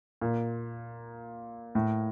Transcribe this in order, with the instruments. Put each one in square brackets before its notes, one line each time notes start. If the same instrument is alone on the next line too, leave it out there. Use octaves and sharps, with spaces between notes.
[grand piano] A#2
A2